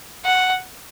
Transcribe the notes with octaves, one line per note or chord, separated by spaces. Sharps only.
F#5